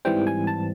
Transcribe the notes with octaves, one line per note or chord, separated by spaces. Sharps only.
G#2 E3 G3 C4 G5
G#5
A5